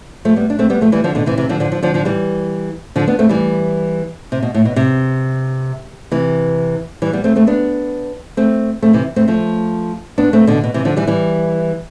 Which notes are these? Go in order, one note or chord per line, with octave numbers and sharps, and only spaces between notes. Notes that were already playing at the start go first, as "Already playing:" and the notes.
F3 A3
G3 B3
D4
A3 C4
G3 B3
F3 A3
E3 G3
D3 F3
B2 D3
C3 E3
C3 E3
D3 F3
D3 F3
D3 F3
D3 F3
D3 F3
E3 G3
D3 F3
B3 D4
A3 C4
E3 G3
C3
B2
A2
B2
C3
C3 E3
E3 G3
G3 B3
A3 C4
A3 C4
B3 D4
A3 C4
A3 C4
C3 E3
A3 C4
F3 A3
B3 D4
A3 C4
B2 D3
B2
C3 E3
D3 F3
E3 G3
E3 G3